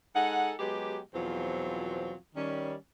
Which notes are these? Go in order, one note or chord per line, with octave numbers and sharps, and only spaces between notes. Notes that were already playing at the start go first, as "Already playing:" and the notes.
G#3 D#4 G#4 A4 F#5
F#3 G#3 B3 G4
E2 B2 F3 F#3 C4 F4
D#3 G3 C#4